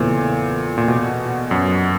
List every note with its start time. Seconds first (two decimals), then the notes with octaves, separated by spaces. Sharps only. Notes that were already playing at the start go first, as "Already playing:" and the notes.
Already playing: E2 A#2 C#3 E3 A3 C#4
0.78 A#2
0.88 B2
1.51 F#2